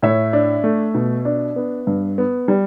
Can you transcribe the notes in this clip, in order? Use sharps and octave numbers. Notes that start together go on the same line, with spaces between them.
A2 C#5 E5
D4
A3
B2
D4
B3
G2
B3
G3